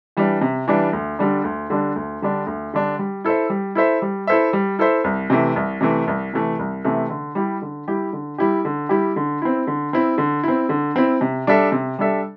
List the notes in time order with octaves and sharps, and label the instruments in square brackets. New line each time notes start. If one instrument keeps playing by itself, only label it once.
[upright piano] E3 G3 D4
C3
E3 G3 D4
D2
D3 G3 D4
D2
D3 G3 D4
D2
D3 G3 D4
D2
D3 G3 D4
G3
E4 A4 C5 E5
G3
E4 A4 C5 E5
G3
E4 A4 C5 E5
G3
E4 A4 C5 E5
C2
C3 E3 A3
C2
C3 E3 A3
C2
C3 E3 A3
C2
C3 E3 A3
D3
G3 E4 G4
D3
G3 E4 G4
D3
G3 E4 G4
D3
G3 E4 G4
D3
C4 E4
D3
C4 E4
D3
C4 E4
D3
C4 E4
C3
G3 D4 A4 E5
C3
G3 D4 A4 E5